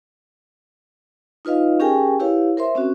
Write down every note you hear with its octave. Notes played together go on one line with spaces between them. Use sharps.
D#4 F4 B4 D#5 F5
C#4 G4 G#4 A#4 G5 G#5
E4 G4 B4 C#5 F5
A#4 C5 E5 C6
C4 C#4 F#4